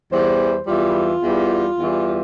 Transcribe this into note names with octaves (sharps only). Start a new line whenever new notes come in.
E2 E3 G3 C5
E2 E3 G3 F4
E2 E3 G3
E2 E3 G3